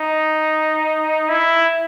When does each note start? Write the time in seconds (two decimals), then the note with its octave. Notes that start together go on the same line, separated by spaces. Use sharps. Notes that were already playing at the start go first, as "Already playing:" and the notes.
Already playing: D#4
1.29 E4